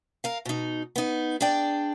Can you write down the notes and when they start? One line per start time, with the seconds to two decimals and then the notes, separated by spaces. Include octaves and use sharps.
0.24 A#4 F5
0.45 B2 D#4
0.96 B3 D#4
1.41 D4 G#4 D5 G5